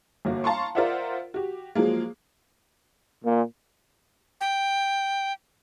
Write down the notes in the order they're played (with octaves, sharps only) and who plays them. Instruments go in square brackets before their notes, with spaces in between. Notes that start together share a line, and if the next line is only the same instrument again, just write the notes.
[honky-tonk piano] G1 A#3 F#4
F5 A5 A#5 C6 C#6
F4 A#4 C5 D5 E5 F#5
F#4 G4
F3 F#3 G#3 A#3
[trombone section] A#2
[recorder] G5